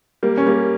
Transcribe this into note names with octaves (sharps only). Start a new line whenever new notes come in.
G3 A#3
C#4
G3 A#3